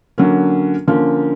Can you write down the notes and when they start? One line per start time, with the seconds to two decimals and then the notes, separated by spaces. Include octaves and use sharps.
0.18 D3 F#3 A#3 C#4
0.87 D3 F3 A#3 C#4